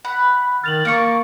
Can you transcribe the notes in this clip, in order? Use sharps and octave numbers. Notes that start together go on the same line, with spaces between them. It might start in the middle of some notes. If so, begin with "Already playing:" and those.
F#5 B5
D#3 F6 A6 F7 F#7
A#3 A#4 C#6 F6 C#7